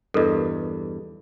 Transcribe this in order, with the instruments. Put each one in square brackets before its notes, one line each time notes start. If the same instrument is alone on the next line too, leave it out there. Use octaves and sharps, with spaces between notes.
[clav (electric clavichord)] E2 G2 [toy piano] A4 A#4 D#5